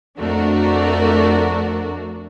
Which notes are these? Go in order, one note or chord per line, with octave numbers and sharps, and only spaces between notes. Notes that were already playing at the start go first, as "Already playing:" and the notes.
F2 A3 D4 F#4 A#4